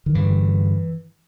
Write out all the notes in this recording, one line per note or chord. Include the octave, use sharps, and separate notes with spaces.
D#3
G2 D3 E3